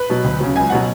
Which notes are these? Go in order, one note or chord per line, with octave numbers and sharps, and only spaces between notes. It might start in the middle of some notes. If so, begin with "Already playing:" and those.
Already playing: B4
B2 F#3
D2
C#3 F#3
C#2 G#5
B2 F#3 F#5